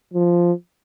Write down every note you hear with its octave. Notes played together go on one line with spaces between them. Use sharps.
F3